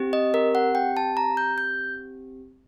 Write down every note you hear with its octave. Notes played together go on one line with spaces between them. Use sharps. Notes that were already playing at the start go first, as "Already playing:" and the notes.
Already playing: C4 G4
D#5
A#4
F#5
G5
A5
A#5
G6
G6